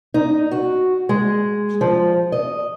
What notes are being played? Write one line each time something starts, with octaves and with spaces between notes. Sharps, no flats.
D#4
F#4
G#3
F3
D#5